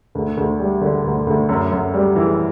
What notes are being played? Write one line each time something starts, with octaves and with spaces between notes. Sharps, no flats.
D2
D2
G3
D3
D2
D2
F#2
F#2
G3
E3